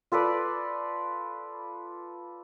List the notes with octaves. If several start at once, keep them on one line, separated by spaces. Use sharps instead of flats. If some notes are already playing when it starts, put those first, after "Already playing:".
F4 A4 B4 D5